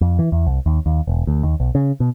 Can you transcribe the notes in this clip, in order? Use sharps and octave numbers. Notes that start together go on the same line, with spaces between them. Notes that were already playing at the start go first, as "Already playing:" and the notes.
F2
E3
E2
C2
D#2
D#2
E1
D2
D#2
B1
C#3
B2